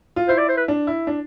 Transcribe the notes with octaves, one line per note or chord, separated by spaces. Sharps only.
F4
E4 C5
D5
C5
B4
D4
E4
D4